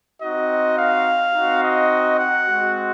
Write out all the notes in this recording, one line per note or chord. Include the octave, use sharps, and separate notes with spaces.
C4 D#4 F#4 D#5
F5
C4 D#4 F#4
D#5
F#5
G#3 C4 F#4